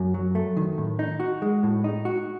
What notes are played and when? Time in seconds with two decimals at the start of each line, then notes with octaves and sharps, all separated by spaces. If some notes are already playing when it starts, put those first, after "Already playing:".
Already playing: F#2
0.14 F#3
0.35 A3
0.57 D#3
0.78 A2
0.99 D#4
1.20 F#4
1.42 G#3
1.63 A2
1.84 D#4
2.05 F#4